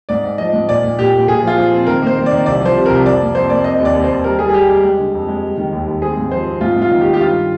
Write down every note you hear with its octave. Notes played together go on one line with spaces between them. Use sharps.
G#2 D5
G#2
F3 D#5
G#2
A#2 D5
A#2
A#2 G4
A#2
A#2 G#4
F3 F4
F3
C4
D#3 A#4
A#3 C5
D#3
D5
D#3
C2 D5
F3 C5
C3
C2 A#4
F2 D5
A#3
F2 C5
A#3 D5
C4 D#5
D#2
D5
D#2
C5
D#2
G3 A#4
G3 G#4
G#4
G3 G4
G3 G4
G#3
D3
F2
G#3
G3
D#3
D#2
D#2
C4 G#4
G#2
F3 C5
C4
G#2 F4
G#2
F4
D#3
G4
D#3
G4
G2 F4